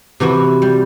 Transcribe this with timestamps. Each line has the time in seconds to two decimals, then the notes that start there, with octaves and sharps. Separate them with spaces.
0.20 C3 E3 F#4 B4
0.62 G3